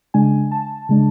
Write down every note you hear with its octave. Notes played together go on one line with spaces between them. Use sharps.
C#3 G#3 D4 G#5
A5
C#3 G#3 D4